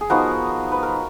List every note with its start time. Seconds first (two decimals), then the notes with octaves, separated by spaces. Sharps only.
0.01 G#4
0.10 F3 B3 D#4 F#4 A#4
0.72 B4
0.83 A#4